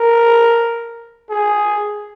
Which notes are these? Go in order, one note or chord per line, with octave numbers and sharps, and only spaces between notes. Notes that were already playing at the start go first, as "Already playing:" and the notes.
Already playing: A#4
G#4